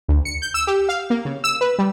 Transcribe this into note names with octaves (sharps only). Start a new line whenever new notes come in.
D2
C#7
G6
E6
G4
F5
A#3
C#3
E6
B4
G3